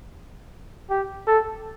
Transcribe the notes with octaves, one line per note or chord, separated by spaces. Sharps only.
G4
A4